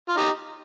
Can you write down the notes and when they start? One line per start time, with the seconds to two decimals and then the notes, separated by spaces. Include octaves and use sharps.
0.09 F4
0.17 D#4 G4